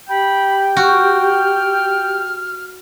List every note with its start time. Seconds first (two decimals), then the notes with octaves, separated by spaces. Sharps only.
0.09 G4 G5 B5
0.77 F#4 F6